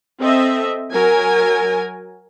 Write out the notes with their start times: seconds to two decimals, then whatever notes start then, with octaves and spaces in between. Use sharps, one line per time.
0.20 C4 A4 D#5 E5
0.92 F#3 A#4 G#5